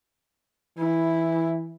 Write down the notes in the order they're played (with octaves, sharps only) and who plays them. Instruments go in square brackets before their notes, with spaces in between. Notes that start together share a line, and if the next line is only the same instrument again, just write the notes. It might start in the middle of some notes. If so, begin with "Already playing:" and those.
[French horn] E3 [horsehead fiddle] E4